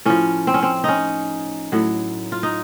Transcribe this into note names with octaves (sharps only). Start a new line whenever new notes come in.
A2 F3 C#4
C4
C#4
C4
C#4 D#4
A2 F#3
F4
D#4